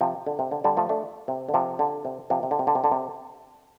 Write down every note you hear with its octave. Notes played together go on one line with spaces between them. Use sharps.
C3 F3
D3
C3
D3
D3 G3
F3 A3
A3 D4
C3
D3
C3 F3
D3
C3
C3 F3
C3
D3
C3
D3
C3
D3
C3